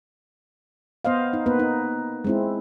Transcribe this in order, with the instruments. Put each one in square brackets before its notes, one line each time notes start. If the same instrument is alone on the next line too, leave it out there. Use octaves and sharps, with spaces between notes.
[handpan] B3 C5 D#5 F5
D#4
A#3 B3 B4
D#4
G#3 C4 E4